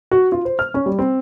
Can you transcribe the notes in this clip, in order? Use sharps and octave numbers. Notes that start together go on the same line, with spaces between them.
F#4
F4
C5
F6
C#4
G3
C4